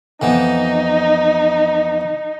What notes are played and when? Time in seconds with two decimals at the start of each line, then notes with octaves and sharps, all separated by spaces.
0.22 F2 E3 B3 D#4